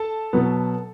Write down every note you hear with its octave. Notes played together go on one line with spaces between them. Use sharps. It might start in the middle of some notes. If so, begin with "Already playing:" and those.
Already playing: A4 A5
B2 F#3 B3